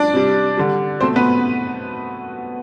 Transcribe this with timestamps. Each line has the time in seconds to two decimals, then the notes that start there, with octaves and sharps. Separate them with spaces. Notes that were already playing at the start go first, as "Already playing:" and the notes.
Already playing: D4 D5
0.13 C3 G3
0.57 D3 G3
1.00 B2 A3 C4 C5
1.16 B3 B4